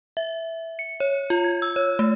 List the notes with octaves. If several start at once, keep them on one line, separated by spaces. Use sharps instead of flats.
E5
C#7
C#5
F4
G#6
E6
C#5
A3